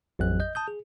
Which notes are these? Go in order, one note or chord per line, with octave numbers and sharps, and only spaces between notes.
A1 F2 F#3 F#6
D#5 G6
A5 D#6 G6
G#4